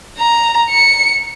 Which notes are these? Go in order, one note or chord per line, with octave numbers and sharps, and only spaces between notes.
A#5
C#7